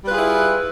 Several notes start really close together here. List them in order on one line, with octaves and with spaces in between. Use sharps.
G3 B4 F4 G#4 E4